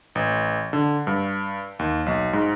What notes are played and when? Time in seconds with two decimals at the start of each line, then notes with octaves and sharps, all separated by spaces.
0.15 A1
0.73 D3
1.07 G2
1.79 D#2
2.06 B1
2.33 G#2